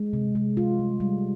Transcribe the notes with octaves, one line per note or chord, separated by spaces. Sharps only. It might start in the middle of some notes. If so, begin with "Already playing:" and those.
Already playing: G#3
C3
G#3
F4
G3
G3